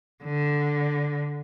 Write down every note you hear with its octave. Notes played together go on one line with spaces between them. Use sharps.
D3